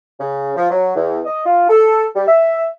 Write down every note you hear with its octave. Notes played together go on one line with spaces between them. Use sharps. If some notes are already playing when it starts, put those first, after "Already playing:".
C#3
F3
F#3
E2
D#5
F4
A4
G3
E5